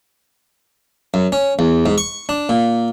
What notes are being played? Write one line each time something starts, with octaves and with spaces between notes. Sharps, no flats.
F#2
C#4
E2
G#2
C#6
D4
A#2